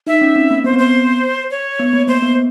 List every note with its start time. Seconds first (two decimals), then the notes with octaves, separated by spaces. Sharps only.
0.07 D#4 E5
0.21 C#4
0.36 C4
0.50 A#3
0.64 B3 C5
0.73 C4
0.79 B3 C5
1.51 C#5
1.79 B3
1.93 A#3
2.08 A#3 C5
2.22 B3